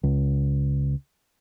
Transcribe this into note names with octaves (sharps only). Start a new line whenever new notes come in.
C#2